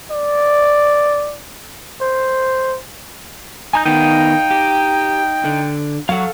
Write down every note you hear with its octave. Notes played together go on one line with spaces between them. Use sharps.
D5
C5
D#4 G#5 A#5 G6
D#3 B3 D#4 F5 G5
G4
D3
F#3 A4 F5 F#5